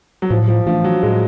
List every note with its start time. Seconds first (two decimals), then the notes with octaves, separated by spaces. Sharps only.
0.22 F#3
0.30 A2 F3
0.48 F3
0.66 E3 F3 A3 D4
0.84 F#3
1.03 A2 G#3